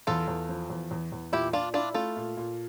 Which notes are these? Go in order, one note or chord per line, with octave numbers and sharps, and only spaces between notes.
E2 F4 A4
E2
F3
E2
E2
E2
A#2 E4 G4
A#2 D4 F4
D4 E4 F4
A3 F4 A4
A#2
A#2